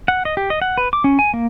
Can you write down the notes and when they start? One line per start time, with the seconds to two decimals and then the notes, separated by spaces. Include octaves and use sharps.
0.08 F#5
0.25 D#5
0.37 G4
0.50 D#5
0.62 F#5
0.78 B4
0.93 D6
1.04 C#4
1.19 G#5
1.34 A#3